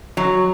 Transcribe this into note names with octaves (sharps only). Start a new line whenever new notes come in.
F#3